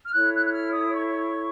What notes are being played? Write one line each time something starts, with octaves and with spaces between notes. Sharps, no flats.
F6
E4 A4 C#5 F#6
F#6
F#6
F6
D#6
C#6